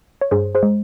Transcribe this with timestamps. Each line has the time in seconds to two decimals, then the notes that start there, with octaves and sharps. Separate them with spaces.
0.21 C#5
0.31 G2 G#4 C5
0.55 G#4 C5
0.63 G#3